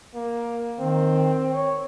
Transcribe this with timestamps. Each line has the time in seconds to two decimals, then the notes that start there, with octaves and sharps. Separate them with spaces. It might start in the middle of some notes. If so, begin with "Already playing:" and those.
0.14 A#3
0.79 D#3 C4
1.51 C#5